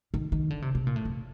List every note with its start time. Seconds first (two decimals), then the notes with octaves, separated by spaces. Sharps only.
0.14 D#3
0.32 D#3
0.50 D3
0.62 C3
0.75 C3
0.87 A#2
0.96 A2
1.05 F2